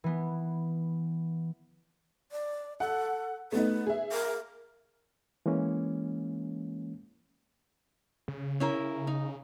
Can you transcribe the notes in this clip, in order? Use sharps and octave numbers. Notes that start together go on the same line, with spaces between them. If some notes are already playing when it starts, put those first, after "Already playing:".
E3 B3
D5
A4 F#5
A3 B3 D#4 B4
G#4 E5
A#4
E3 G#3 A#3 C#4
C#3
C#4 E4 A#4
D#4